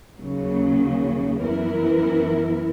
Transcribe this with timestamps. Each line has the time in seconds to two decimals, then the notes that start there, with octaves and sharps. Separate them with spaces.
0.18 D#2 C#3 F#3 A#3 C#4
1.41 F#2 E3 B3 E4 A#4